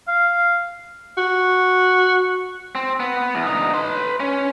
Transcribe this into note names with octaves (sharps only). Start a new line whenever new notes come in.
F5
F#4
C4
B3
E2
D2 D#4
B4 C6
C#4